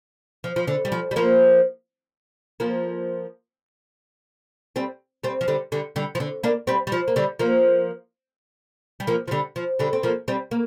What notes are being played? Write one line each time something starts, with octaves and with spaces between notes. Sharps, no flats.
F3
F3
D3
G3
F3
G3
F3 A#3
F3 A#3
G3 C4
G3 C4
F3
D3 G3
D3 G3
D3 G3
F3
D3
A#3 D4
G3 C4
G3
F3
A#3
D3 G3
F3 A#3
G3
F3 A#3
F3
D3 G3
F3
D3 G3
C4
F3 A#3
G3 C4
A#3